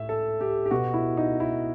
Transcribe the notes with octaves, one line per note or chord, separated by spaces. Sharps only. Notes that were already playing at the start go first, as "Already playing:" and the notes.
Already playing: A2 E5
A4
G4
G4
B2 F#4
E4
D#4
E4